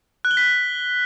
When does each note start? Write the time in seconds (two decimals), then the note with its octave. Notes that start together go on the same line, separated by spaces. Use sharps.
0.25 F#6
0.31 G7
0.37 B6